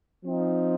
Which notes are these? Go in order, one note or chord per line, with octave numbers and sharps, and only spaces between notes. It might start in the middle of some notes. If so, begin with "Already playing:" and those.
F3 C4 D#4